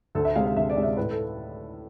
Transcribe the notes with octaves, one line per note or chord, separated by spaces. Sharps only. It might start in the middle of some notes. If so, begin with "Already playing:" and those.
D2 A4
E5
C3 G#3 F5
F5
D2 E5
D5
C3 G#3
E5
A2 B4
A4